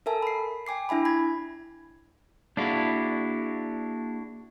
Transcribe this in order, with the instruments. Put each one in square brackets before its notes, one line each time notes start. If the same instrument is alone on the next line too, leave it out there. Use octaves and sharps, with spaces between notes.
[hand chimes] A4 A#4 E5 G#5 A5
B5 C7
G5 G#5 D6 C7
D4 E4 E5 G#5 B5
B5 G#6
[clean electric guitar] A#3 G#4 F5 [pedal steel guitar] D4 E4 F#4